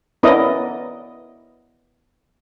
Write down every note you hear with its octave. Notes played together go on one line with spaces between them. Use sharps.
B3 C#4 E4 A#4 D5 D#5